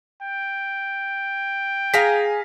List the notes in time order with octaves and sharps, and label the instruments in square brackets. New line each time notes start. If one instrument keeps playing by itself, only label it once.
[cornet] G5
[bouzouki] G#4 G#5 A#5 [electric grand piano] F5 A#6 B6